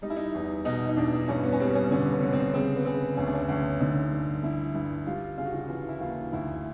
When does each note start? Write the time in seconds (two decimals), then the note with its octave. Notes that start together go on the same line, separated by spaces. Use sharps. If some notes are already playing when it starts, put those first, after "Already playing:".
0.02 G3 D#4
0.10 E4
0.16 D#4
0.35 E2
0.65 B2 D#4
0.89 D#4
0.97 E2 D4
1.28 G2 C#4
1.44 B3
1.53 C#4
1.60 G3 C4
1.75 C#4
1.91 D3 C#4
2.13 B3
2.22 D3
2.33 C4
2.54 C#3 C4
2.76 B3
2.85 C#3 C4
3.17 D2 C#4
3.26 D4
3.34 C#4
3.48 D2
3.80 D3 D#4
4.11 G2
4.43 D3 E4
4.74 G2 E4
5.06 G3 F4
5.38 C#3 F4
5.45 F#4
5.54 F4
5.69 E3 F4
5.89 E4
6.00 D#2 F4
6.33 D2 E4